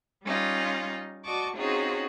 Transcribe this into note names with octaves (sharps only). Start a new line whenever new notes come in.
G3 C#4 D#4 F4
F#4 D5 D#5 A5 C#6 D6
C4 C#4 D#4 F4 F#4 G#4